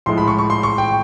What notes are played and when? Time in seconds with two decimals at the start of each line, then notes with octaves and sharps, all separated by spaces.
0.06 A2 F3 G#3 C6
0.18 B5
0.28 C#6
0.38 C#6
0.50 C6
0.63 C#6
0.78 G5